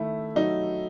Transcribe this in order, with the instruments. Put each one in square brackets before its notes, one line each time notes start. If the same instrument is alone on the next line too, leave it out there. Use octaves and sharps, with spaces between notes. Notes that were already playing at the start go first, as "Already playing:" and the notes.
Already playing: [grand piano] D#3 A3 [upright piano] E4
[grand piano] F#3 [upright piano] D#4